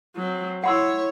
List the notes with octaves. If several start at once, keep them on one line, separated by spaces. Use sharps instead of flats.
F#3 C4
E4 C#5 F#5 C6 E6